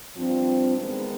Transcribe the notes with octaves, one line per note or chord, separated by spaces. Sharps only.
G2 F3 C4
D#3 G#3 B3 D#4